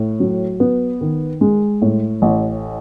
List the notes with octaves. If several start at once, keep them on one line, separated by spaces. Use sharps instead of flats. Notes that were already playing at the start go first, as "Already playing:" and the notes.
Already playing: A2
F#3
B3
D#3
G#3
A2
A1